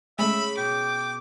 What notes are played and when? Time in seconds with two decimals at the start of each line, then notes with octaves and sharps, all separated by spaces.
0.19 C#3 G#3 A3 E5 B5
0.57 B2 G5 D6